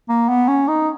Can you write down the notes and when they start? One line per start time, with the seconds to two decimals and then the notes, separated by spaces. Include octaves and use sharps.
0.09 A#3
0.28 B3
0.48 C#4
0.68 D#4